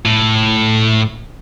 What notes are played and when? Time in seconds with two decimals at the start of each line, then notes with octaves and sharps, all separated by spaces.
0.05 A2